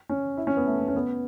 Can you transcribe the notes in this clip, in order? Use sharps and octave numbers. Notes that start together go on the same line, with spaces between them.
C#4
E4
C#4
B3
A3
B3
C#4
B3